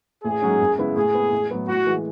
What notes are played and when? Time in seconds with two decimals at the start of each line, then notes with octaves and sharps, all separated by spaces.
0.24 A1 G#4
0.42 G#2 F#3 C#4
0.60 F#2
0.78 C#3 G#3 B3 E4
0.96 A2 G#4
1.15 G#3 B3
1.32 A1
1.51 A2 F#3 B3
1.68 A2 F#4
1.86 E3 G#3